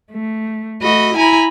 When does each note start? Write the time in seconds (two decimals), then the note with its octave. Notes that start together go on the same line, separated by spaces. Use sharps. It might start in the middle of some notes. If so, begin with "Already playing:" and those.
0.12 A3
0.81 A3 F#4 D#5 B5
1.15 E4 G#5 A#5 B5